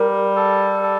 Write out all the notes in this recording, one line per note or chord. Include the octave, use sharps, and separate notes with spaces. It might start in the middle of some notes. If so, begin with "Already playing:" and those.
Already playing: G3 A#4
A4
A4